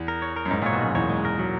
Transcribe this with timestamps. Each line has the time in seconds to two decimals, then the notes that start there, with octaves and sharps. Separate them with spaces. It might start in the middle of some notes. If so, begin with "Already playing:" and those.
Already playing: E2
0.08 A#4
0.22 C#5
0.36 A#4
0.46 F#2
0.51 G#2 D#4
0.62 A#2 C#5
0.73 B2
0.81 F#2 G#3
0.95 E2 C#5
1.09 G#3
1.25 A#4
1.39 F#3